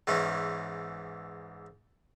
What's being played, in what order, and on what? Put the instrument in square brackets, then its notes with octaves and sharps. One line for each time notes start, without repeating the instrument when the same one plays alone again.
[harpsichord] E2 G#2 E3 C#4